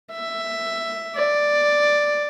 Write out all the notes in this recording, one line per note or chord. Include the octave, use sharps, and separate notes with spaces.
E5
D5